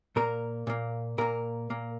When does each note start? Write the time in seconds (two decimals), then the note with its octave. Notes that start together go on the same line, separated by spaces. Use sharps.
0.16 A#2 A#3 A#4
0.67 A#2 A#3
1.18 A#2 A#3 A#4
1.70 A#2 A#3